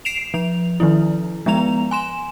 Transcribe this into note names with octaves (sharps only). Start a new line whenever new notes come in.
C7 D7 E7 F7
F3 F7
D#3 F3 E4
F3 G#3 B3 A#5 F7
G#5 C6 E7